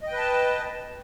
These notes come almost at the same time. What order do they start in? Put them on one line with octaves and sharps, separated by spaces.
D#5 G5 B4 A5